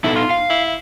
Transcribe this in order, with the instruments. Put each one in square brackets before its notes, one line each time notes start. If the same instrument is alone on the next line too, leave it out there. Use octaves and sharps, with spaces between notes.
[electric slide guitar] B3 D#4 A4 [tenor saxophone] E4
[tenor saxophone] F4
[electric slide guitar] F5
[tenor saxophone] E4